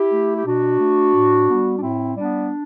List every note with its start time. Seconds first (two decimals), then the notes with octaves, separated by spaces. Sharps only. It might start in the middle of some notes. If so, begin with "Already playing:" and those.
Already playing: E4 G4
0.12 A3
0.36 G4
0.45 B2 D4 F#4
0.80 A3
1.13 A2
1.48 G3 B3
1.78 D4
1.81 A2 C4 E4
2.15 G3 B3 D4